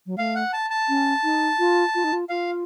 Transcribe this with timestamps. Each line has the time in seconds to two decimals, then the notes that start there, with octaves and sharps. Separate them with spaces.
0.06 F#3
0.18 A3 F5
0.36 F#5
0.53 A5
0.70 A5
0.89 C#4
1.24 D#4
1.59 F4
1.95 F4
2.04 D#4
2.13 F4
2.29 F4 F5